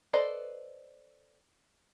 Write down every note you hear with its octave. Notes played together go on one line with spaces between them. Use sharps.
A4 B4 C5 D5 D#5